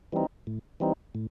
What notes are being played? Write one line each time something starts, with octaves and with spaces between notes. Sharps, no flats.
E3 G3 C4 D#4
A2
E3 G3 C4 D#4
A2